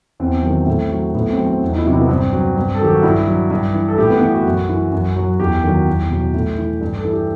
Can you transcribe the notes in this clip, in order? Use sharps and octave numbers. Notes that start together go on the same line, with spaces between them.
E2 C4
D#3 F#3
A2
F#3
A2 B3
C4
F#3
C4
E2
D#4
E4
C3 F#3
E4
B3
G2 C4
F#3
G2
A4
D#3 F#3 G4
F#4
G2 E4
F#3
G2
E3
A4
A2 G4
B3
E3 B3
F#4
F#2
E3
F#2
F#3
E2 G4
D#3 F#3
E2
B2 F#3
A2
E3
G2
A4
E3
G4